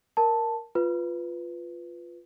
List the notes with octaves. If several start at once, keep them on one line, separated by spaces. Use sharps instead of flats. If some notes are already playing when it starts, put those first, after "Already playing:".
A#4 A5
F4 B4